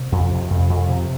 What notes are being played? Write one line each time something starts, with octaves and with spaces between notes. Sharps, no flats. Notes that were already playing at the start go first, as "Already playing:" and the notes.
Already playing: C3
F2
C3
F2
F2
C3